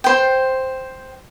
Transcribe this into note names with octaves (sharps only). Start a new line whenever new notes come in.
C5 G5